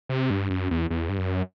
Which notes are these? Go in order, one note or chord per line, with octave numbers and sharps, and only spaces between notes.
C3
G2
F#2
E2
E2
G2
F#2